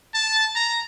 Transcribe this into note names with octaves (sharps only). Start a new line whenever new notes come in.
A5
A#5